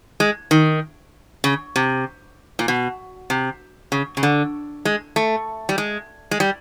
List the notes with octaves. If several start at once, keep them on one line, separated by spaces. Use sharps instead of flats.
G#3
D#3
C#3
C3
A#2
B2
C3
C#3
C#3
D3
G#3
A3
G3
G#3
G#3
G3